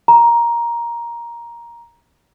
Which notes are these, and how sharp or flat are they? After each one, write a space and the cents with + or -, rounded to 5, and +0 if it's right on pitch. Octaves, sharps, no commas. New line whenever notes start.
A#5 +10